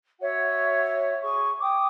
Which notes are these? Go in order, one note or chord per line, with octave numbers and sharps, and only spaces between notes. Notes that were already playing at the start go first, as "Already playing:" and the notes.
F#4 C#5 E5 F#5
G#4 C#6
G5 D6 D#6